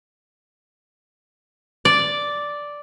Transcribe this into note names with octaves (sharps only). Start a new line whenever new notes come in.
D5